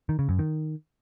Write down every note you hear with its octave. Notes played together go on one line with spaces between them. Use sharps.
D#3
C#3
F#2
D#3